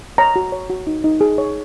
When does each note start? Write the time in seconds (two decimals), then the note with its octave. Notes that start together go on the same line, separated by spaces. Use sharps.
0.18 C#5 A#5
0.36 F#4
0.52 C#5
0.70 F#4
0.87 D#4
1.04 D#4
1.21 G#4
1.38 C#5